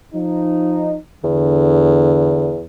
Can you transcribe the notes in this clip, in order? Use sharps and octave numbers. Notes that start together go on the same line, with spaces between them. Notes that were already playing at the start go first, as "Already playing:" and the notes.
F3 D#4
E2 D3